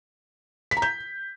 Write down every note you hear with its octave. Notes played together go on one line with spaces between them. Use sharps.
B6
A#5
G6